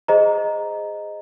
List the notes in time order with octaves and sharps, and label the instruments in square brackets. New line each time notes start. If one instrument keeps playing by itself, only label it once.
[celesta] G#4 C5 D#5 A#5